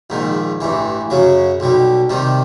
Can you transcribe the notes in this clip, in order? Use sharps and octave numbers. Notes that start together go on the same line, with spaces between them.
A#1 G#2 D#3
A1 G2 E3
F#2 C#3 F#3
B1 B2 G3
C3 D#3 G3